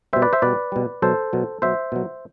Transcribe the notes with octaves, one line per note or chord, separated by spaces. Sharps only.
B2 G3 C5 E5
B4 D5
C5 E5
B2 G3 B4 D5
B2 G3
B2 F#3 A4 C5
B2 F#3
B2 F#3 C5 E5
B2 F#3